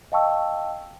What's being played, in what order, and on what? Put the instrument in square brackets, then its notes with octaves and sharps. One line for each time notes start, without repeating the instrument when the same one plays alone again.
[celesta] D#5 F5 G5 A5 C#6 E6